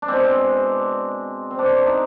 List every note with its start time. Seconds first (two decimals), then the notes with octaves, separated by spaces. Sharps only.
0.02 D4
0.08 B2 G#3 C4
1.51 C4
1.59 D4
1.76 D4
1.86 D#4